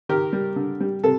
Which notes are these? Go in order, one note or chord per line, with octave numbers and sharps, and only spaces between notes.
D#3 G4 A#4
G3
D3
G3
C3 A4